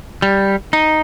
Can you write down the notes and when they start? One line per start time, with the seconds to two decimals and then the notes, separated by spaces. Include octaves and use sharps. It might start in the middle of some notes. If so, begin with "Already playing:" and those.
0.22 G3
0.73 D#4